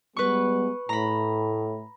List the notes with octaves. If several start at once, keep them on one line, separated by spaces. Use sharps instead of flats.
G3 G#3 B3 B4 C#6
A2 A#5 B5